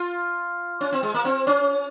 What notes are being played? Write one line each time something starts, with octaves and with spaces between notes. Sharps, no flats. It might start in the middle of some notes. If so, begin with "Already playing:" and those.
Already playing: F4
C#4
C4
G#3
A#3
C4
C#4